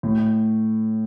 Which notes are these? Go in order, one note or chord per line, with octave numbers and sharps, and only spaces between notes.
A2